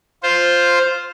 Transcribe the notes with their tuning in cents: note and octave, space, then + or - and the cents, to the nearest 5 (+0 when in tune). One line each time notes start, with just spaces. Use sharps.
F4 +0 C5 +0